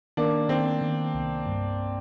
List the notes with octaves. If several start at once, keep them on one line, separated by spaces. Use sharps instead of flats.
D#3 A#3 D4
D#3 C4
D#3
C2
G2